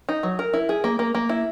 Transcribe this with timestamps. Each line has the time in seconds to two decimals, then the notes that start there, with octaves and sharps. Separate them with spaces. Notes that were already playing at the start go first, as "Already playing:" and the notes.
0.09 D#4
0.23 F#3
0.39 A#4
0.53 E4
0.69 G#4
0.84 A#3
0.99 A#3
1.15 A#3
1.29 E4